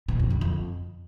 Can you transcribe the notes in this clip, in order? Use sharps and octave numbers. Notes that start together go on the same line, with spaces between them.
B2
F2
D3
F2